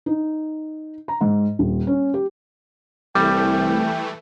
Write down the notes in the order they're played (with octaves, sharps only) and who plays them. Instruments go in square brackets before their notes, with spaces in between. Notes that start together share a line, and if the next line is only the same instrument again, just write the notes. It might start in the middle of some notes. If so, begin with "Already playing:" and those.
[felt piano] D#4
A#5
G#2
D#1
C#4
G4
[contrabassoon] C2 [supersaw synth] E3 A3 [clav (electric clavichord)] G3 [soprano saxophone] G5